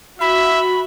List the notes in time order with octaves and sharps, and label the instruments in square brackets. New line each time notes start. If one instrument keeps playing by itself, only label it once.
[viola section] F#4 [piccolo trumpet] E5 [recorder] B5